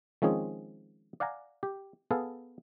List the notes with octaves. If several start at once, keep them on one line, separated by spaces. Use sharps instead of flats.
D#3 F3 G#3 C4 C#4 G#4
D5 F5 F#5 G#5 A#5
G4
B3 G#4 A4 F5